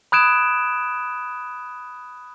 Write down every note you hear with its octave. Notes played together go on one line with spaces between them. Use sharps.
B5 D#6 F#6 G#6 D7 E7